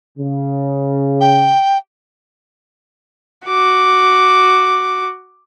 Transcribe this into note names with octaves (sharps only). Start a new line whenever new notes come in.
C#3
G5
F#4 D6